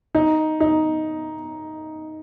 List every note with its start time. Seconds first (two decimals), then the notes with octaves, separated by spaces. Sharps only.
0.15 D#4
0.60 D#4